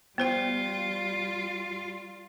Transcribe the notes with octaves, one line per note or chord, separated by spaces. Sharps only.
G3 B3 F4 C5 G5